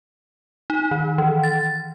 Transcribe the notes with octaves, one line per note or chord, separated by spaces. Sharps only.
D#4
D#3
E3
A6